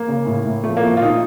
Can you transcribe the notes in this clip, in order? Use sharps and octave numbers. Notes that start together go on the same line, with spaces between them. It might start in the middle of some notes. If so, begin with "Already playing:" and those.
Already playing: A#3
C#3
A2
A2
F3 A3
A#3
F3
F4
A#2 D#4